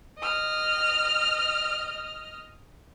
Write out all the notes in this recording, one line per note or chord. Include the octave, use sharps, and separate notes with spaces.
D#5 F6